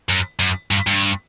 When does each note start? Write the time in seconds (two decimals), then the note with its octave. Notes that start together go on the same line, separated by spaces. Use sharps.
0.09 F#2
0.39 F#2
0.71 G2
0.87 G2